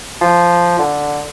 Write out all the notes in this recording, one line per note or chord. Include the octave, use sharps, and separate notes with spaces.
F3
D3